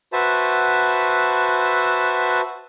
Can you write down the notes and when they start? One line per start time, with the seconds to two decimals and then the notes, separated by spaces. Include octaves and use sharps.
0.13 F#4 B4 C5 E5 A5